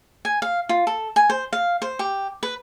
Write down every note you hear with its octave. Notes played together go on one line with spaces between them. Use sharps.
G#5
F5
F4
A4
G#5
C5
F5
C5
G4
B4